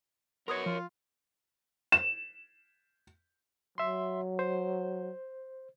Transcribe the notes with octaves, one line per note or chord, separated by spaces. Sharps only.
F#3 B3 A#4 C#5 C6 D#6 G#6
F3 F4
E7
F#3 E5 C6
C5